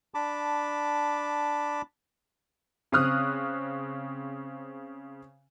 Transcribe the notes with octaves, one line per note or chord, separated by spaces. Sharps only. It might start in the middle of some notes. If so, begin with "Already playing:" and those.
D4 A5 B5 D6
C#3 C4 D#6 F6 F#6